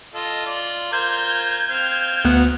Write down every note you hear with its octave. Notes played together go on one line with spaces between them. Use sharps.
F4 A4 D#5
F4 D5
F4 A#4 C5 G6 G#6
C4 F5
D2 B3 F#6